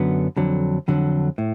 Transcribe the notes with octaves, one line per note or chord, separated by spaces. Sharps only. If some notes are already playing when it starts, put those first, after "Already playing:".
Already playing: F#2 D3 F#3 B3
F2 D3 F#3
F2 D3 F#3
A2